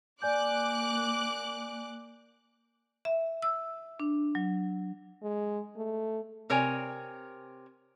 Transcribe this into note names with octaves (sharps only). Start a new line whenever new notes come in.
A#3 D5 G#5 D6 F#6 G6
E5
E6
D4
F#3
G#3
A3
C3 A#4 C#5 G5 G#5